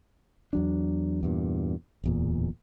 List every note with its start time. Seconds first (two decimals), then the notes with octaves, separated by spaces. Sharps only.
0.53 E2 F#3 D4
1.23 E2 G2 A#2
2.04 D1 E2 A#2